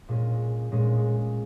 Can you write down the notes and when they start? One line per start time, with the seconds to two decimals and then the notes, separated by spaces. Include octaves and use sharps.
0.08 A#2 G#3 C#4
0.72 A#2 G#3 C#4